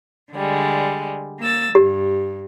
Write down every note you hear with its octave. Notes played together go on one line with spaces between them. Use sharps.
D3 G3 G#3
A#3 E6 A6
G2 G4